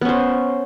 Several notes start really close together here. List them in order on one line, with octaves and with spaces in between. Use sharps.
B3 C#4 C5